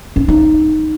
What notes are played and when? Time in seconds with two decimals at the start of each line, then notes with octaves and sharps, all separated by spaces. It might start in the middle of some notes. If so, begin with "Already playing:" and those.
0.16 C#4
0.28 D#4